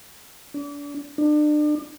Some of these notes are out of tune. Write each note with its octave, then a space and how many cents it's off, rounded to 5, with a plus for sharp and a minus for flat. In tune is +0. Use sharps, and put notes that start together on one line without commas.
D4 -35
D4 +35